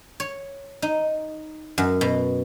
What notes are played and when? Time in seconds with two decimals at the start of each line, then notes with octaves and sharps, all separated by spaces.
0.20 C#5
0.82 D#4
1.78 F#2
2.01 B2